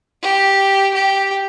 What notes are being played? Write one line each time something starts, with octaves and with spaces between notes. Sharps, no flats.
G4
G4